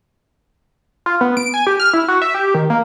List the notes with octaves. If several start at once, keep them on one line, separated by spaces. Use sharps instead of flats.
F4
B3
D7
G#5
G4
F6
E4
F#4
E5
G4
D#3
A#3